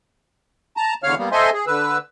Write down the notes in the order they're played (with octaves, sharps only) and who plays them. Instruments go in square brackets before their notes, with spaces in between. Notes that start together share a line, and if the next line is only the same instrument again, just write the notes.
[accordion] A5 A#5
E2 D3 C#5 F5 F6
G3 A#3 B3
A4 C5 D#5 E5 G#5 C6
G#4
D3 B4 E6